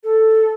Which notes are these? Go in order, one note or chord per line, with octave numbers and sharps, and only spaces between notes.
A4